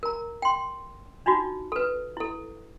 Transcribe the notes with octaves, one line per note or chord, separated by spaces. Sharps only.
A#4 A#5
G5 C6
D4 D#4 F4 F#4
A4 B4
E4 A4